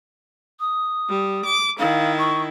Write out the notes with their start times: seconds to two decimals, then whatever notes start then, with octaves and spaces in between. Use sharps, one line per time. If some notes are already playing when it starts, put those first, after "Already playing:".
0.60 D#6
1.09 G3
1.45 D6
1.79 D#3 E4 F5
2.18 C#6